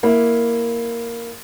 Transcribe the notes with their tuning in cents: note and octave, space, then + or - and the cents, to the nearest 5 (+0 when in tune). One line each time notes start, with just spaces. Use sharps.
A#3 +0 E4 +0